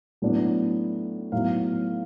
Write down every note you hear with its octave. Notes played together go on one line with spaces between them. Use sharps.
A2 F#3 B3 D4
A2 F#3 B3 F5